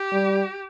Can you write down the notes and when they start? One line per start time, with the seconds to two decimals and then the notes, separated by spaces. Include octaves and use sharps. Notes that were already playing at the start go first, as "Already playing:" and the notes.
Already playing: G4
0.12 G3